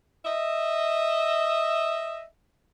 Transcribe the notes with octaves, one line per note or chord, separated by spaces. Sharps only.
D#5 E5